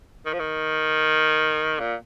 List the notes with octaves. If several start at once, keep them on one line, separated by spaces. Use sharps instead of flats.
D#3
F3
D#3
A#2